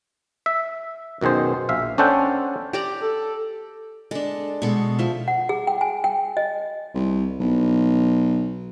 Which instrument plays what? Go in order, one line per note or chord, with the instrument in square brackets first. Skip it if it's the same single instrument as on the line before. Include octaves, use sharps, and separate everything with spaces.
[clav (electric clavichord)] E5
F#2 B2 D#3 G#4 C5
A#1 E5 F5
C#4 D4 A4 C5 F#5 G5
[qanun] G4 D5 A#5
[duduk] A4
[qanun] G#3 D4 [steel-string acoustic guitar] A4
[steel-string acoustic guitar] B2 G#3 [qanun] A4 C#6
[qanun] F3 E5
[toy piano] F#5
G#4
G5
G#5
G5
D#5
[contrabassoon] C2
B1